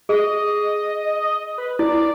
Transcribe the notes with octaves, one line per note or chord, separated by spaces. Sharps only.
G#4 D#5
B4
E4 D5